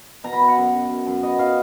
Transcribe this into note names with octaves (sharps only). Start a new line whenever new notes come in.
B2 A#5
B5
B2 A#5
F#5
F#2
F#2
F#2
F#2
B3 D#5
F#3 F5